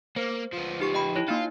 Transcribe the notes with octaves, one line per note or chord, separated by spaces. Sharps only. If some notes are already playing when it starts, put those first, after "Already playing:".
A#3 C5
F3 B3
D#4 G4 C#6
D#5 G5 B5
E4 C#5
A#3 D#4 F4